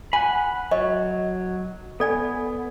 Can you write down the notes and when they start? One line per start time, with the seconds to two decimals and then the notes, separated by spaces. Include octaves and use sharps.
0.13 F#5 G#5 B5
0.71 F#3 C#5 D#5
2.00 B3 A4 D5 G#5